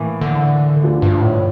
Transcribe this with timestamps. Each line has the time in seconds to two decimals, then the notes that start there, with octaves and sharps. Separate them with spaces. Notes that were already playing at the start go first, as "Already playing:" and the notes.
Already playing: A2 E3 A#3
0.21 D3
0.82 D2 D3 F3
1.02 G2
1.22 A2